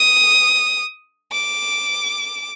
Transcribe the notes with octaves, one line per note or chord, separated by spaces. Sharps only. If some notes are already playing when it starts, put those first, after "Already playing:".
Already playing: D#6
D6